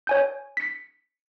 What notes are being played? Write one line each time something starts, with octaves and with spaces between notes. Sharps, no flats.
C#5 G#5 G6
B6 C#7